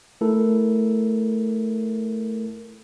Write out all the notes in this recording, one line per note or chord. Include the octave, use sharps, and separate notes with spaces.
A3 E4 A4 A#4